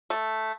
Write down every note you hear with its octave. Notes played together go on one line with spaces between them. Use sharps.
A3